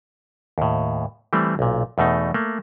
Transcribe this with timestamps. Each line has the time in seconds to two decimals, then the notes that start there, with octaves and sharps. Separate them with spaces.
0.58 D#2 A2
1.33 E3 G3 A3 C4
1.59 B1 A#2
1.98 E2 B2 A3 D#4
2.34 A3 A#3